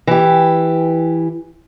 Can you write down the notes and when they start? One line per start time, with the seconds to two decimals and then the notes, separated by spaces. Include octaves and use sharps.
0.07 E3 G4